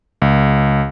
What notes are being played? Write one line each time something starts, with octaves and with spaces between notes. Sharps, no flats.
C#2